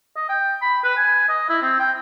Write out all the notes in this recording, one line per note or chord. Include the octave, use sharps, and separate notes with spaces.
D#5
G5
B5
B4
G#5
D#5
E4
C4
G5